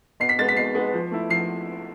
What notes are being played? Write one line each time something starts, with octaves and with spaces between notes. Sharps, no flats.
B2 C7
B6
G#3 B3 A6
B6
B2 C7
G#3 B3
F3
A3 E4
F3 C7